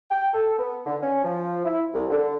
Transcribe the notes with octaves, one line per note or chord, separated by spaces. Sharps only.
G5
A4
B3
D3
C#4
F3
E4
C2
D3